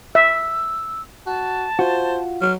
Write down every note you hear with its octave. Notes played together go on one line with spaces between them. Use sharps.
E5 E6
F#4 A5
F4 F#4 C5
F#3 F6